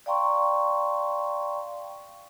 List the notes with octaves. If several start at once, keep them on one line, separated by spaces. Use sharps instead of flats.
D5 F5 G5 A#5 C6 C#6